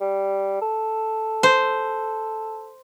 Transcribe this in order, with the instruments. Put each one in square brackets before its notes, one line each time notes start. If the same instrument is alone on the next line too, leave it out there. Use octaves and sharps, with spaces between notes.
[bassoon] G3
A4
[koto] C5